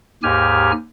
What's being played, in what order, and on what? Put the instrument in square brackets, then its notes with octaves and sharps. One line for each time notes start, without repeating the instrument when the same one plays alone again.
[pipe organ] D#2 G#2 G4 G#5 F6